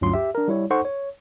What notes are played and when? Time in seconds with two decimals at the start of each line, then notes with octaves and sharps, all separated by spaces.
0.01 D2 G2 F#3 C#4 F4 C6
0.14 G4 E5
0.35 D4 A#4
0.48 G3 E4 C#5
0.70 D#4 A4 C5 F#5 C6 C#6
0.85 C#5